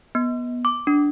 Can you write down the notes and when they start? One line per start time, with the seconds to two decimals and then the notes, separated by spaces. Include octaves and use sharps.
0.15 B3
0.65 D6
0.87 D4